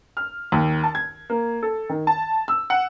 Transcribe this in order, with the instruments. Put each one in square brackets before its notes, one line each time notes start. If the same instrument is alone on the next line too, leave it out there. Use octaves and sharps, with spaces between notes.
[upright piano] F6
D#2
A5
G#6
A#3
A4
D#3
A5
E6
F#5